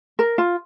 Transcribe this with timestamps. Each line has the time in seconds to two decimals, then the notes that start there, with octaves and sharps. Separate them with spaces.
0.19 A#4
0.38 F4